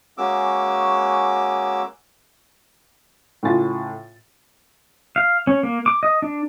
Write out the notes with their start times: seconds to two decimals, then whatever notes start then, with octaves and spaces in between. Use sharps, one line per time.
0.18 G#3 A#3 C#4 F#4 D6 E6
3.43 A2 C#3 F4 G#5 A6
5.16 F5
5.47 C#4
5.63 A#3
5.86 D6
6.03 D#5
6.22 D4